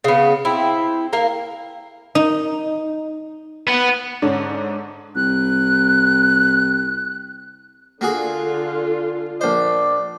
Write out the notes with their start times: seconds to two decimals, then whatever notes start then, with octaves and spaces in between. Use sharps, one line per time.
0.04 C#3 B3
0.45 C4 E4
1.13 A#3 A#4
2.15 D#4
3.67 B3
4.22 G#2 D3 C#4 D4
5.16 C2 F#6
8.01 D3 A#3 F4 F#4 G#4
9.41 A#1 C5 D5